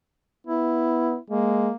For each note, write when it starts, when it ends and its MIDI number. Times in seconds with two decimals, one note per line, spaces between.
0.47 1.17 59
0.47 1.18 64
1.30 1.70 56
1.30 1.76 58